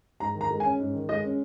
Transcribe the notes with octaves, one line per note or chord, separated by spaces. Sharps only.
G#2 A#5
D#3
A#5
G#3
G#5
C#4
G#2
D#3
G#3 D#5
C#4